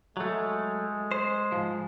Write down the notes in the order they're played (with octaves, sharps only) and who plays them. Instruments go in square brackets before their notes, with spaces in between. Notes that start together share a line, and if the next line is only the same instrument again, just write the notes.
[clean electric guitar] F#3 A3 [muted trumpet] G#3
[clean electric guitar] C5
G#2 F3